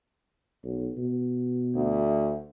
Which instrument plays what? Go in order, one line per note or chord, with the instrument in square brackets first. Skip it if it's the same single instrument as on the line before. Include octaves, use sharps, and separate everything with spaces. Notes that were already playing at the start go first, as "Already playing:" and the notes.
[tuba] B1
B2
[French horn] D2